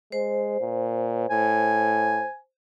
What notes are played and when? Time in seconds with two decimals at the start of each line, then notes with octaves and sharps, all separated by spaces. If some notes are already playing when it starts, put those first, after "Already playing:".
0.12 G#3 C5
0.60 A#2
1.30 A2 G#5